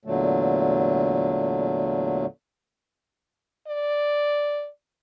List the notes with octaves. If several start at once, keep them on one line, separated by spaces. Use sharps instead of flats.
E2 A#2 D3 F#3 A3
D5